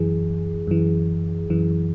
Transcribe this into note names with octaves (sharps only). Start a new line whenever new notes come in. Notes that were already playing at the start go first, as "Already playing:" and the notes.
Already playing: F#2 E3 G#4
F#2 E3
F#2 E3